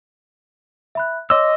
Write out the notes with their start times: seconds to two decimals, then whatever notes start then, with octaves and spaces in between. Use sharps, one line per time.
0.95 E5 B5 F#6
1.30 C#5 D#5 C6 D6 E6